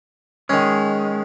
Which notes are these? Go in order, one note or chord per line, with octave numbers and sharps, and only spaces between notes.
D#3 G#3 C#4